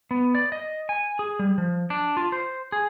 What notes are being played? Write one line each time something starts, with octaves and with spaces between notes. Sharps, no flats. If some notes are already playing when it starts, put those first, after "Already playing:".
B3
D5
D#5
G#5
G#4
G3
F3
D4
F4
C5
G#4